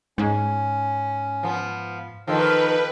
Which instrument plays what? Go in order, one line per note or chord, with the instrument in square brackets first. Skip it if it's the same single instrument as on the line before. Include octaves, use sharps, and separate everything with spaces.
[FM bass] G#2 [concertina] C#4
[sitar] F3 B3
[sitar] D#3 F3 [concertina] A4 G5 [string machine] B4